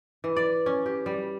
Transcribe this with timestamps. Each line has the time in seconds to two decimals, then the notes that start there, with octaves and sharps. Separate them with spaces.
0.24 E3
0.36 D5
0.66 C#4
0.86 G4
1.06 G3